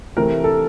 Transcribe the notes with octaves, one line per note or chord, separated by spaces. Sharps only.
C3 E3 A3 A#4
A4